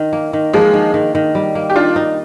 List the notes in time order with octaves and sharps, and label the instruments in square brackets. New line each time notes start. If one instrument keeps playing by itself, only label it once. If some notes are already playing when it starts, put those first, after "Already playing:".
Already playing: [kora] D#3
A#3
D#3
[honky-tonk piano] F3 G#3 [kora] A#3
[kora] D#3
D#3
D#3
G3
A#3
[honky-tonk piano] G4
[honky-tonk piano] D4 F4 [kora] D#4
[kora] D#4